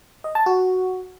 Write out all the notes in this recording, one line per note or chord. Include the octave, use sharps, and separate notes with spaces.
D#5
A5
F#4